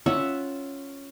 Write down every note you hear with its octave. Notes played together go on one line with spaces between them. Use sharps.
C#4 F4 E5 F#5